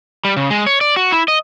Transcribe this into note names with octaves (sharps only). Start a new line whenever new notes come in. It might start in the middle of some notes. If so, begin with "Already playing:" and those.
G3
C#3
G#3
C#5
D5
F#4
E4
D#5